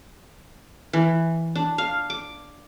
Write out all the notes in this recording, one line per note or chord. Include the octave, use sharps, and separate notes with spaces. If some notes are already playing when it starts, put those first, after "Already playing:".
E3
D4
F5
D6